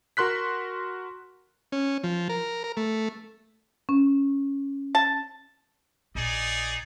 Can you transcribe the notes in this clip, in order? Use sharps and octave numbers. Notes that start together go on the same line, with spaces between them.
F#4 A#4 C6 F#6 B6
C#4
F3
A#4
A#4
A3
C#4
A5
A#1 D#4 G#4 D5